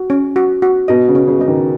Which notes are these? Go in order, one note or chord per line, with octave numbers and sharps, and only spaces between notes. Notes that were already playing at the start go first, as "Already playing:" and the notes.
Already playing: F#4
C#4
F#4
F#4
B2 D#5
C#3
C#4
C#3
C#3 D#5
D#3